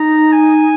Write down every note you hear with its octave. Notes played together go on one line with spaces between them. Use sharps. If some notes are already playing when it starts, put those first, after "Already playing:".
Already playing: D#4 A#5
G#5